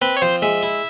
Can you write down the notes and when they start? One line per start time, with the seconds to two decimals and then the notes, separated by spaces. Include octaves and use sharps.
0.02 C4 B4
0.17 C#5
0.22 F3 C5
0.42 G#3 E5
0.63 E4